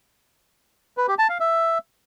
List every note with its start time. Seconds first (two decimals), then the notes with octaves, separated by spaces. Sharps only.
0.97 B4
1.08 G4
1.19 A5
1.29 F5
1.40 E5